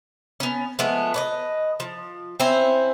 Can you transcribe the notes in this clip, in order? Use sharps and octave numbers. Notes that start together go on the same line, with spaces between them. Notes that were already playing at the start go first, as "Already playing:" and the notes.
B3 C#4
F3 G#3 A3 B3
B4 C#5 D#5
F3
C4 C#4 E4 C5